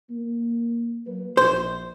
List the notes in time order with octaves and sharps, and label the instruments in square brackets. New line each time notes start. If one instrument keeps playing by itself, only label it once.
[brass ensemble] A#3
F#3 A#3 B4
[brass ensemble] A#1 [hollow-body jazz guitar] C5